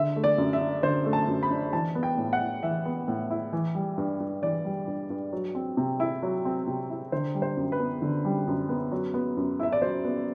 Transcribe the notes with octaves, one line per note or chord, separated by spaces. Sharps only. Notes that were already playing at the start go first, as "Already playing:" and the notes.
Already playing: D3 E5
A3
D5
F#2
E5
D4
D3 C5
A3
A5
F#2
B5
D4
E3 A5
B3
G5
A2
F#5
E4
E3 E5
B3
A2
E4
E3
G3
G2
G2
E3 D5
G3
G2
G2
F#3
C4
C3
E4
F#3
C4
C3
E4
D3 C5
G3
C5
F#2
B4
B3
D3
G3
F#2
B3
F#3
B3
F#2
E4 E5
D5
F#3 C5
B3